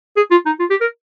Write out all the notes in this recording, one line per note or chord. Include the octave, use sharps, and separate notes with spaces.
G#4
F4
D#4
F4
G4
A#4